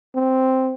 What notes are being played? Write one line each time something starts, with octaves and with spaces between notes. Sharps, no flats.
C4